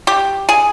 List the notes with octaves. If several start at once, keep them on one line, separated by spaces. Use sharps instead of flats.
G4
G#4